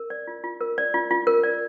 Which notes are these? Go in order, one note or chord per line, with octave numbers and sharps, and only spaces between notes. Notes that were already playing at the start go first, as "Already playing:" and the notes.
Already playing: A#4
D5
F4
F4
A#4
D5
F4
F4
A#4
D5